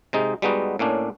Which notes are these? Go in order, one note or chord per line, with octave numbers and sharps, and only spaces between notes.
C3 G#3 D#4
G3 G#3 B3 D#4 F#4
A2 A#3 C#4 D4